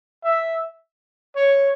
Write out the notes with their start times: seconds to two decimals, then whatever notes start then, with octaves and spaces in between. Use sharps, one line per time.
0.24 E5
1.36 C#5